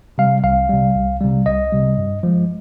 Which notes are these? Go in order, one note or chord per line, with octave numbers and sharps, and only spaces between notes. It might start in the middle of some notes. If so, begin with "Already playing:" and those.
C3 G3 F5
C2 F5
C3 G3
C2
C3 G3
C2 D#5
C3 G3
G2
F3 G#3